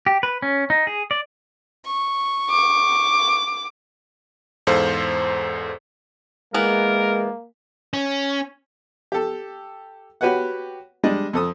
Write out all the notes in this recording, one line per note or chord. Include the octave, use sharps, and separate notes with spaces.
G4
B4
C#4
D#4
G#4
D5
C#6
D6
E2 G#2 A4 C5 F5
E3 G#3 A#3 B3 A#4
C#4
G4 A4
F#4 G4 B4 C#5 F#5
G3 G#3 D4 D#5
F2 A4 D#6